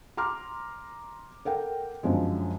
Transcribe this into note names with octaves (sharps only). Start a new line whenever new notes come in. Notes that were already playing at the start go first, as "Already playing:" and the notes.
A#5 C6 D6 F6
A4 A#4 F#5 G5
F#2 D3 F3 G#3